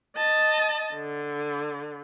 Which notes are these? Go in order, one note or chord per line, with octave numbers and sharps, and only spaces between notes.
D#5 A5
D3